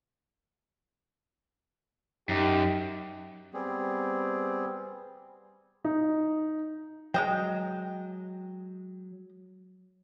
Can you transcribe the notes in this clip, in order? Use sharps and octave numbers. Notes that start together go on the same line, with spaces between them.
F#2 D#4 G4
G3 B3 C4 G#4
D#4
F#3 G#3 D#5 G5